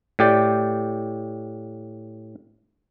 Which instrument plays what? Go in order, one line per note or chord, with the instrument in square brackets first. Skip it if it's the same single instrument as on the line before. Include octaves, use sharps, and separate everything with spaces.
[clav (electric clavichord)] A2 G4 D5